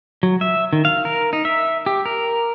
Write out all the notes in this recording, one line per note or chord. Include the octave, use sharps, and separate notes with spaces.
F#3
E5
D#3
F5
A#4
D#4
E5
G4
A#4